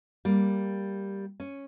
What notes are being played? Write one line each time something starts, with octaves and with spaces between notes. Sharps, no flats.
G3 A#3
C#4